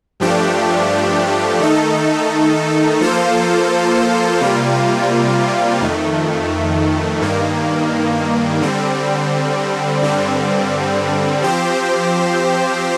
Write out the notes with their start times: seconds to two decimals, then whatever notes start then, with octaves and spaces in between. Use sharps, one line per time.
0.20 G2 F3 A3 D4 G4
1.60 D#3 A3 D#4 A4
3.01 F3 A#3 F4 A4 C5
4.41 C3 G3 A#3 F4
5.81 F2 D#3 A3
7.21 G2 D#3 A#3
8.61 D3 G3 C4
10.02 G2 D3 G3 C4
11.42 F3 C4 G4 C5